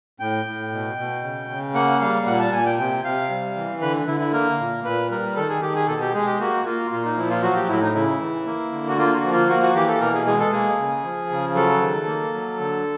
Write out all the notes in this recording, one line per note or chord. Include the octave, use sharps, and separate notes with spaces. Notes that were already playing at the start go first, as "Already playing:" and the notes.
A2 G5
A2
B2
B2
C#3
C#3
A#3 F#5
G3 F5
A#2 F#5
A5
A#2 G#5
G5
C3 G5
C3 F5
G3
E3
D3 B4
D3 E4
E4
A#3 A#4
A#2
A#2 B4
G3 A#4
D#3 A4
G#4
D#3 G4
G#4
B2 A4
G4
G#3 G#4
G4
A#3 F#4
A#3 F4
A#2 F4
D#4
F3 E4
F4
F#3 F#4
G4
A2 E4
D#4
C#3 E4
E3
A#3
D3
F#4
A#3 F4
F#4
F3
F4
A#3 F#4
F#4
E3 G4
A4
B2 A#4
G#4
G#3 G#4
A4
A#3 G#4
C#3
F3
C#3
F#3 A4
D#3
A#3
F#3
D3